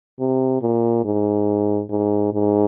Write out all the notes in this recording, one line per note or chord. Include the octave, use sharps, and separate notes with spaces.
C3
A#2
G#2
G#2
G#2